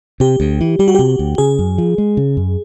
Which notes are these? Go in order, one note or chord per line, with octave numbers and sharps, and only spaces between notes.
C3 G4
D2
E3
G3 G4
F#4
C3 G4
D2
C#3 G#4
F#2
F3
G#3
C#3
F#2